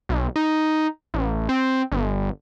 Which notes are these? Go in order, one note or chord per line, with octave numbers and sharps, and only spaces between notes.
B1
D#4
A1
C4
G1